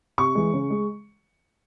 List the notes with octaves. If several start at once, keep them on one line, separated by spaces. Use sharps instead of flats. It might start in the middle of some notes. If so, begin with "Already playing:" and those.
C3 C#6
E3 G#3
C#3
G#3